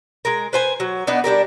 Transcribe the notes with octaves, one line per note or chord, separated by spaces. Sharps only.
G#3 A#4
B4 C5 G#5
F#3
B3 D4 D#4
G3 D4 G4 A#4